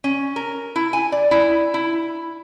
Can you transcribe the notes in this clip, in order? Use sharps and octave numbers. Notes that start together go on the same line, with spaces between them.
C#4
A#4
E4
G#5
D5
E4
E4